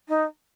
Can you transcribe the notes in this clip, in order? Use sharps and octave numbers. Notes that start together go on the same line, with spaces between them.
D#4